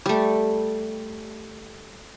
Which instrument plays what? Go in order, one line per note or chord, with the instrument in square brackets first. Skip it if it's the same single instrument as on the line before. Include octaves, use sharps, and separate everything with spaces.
[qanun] G3 A3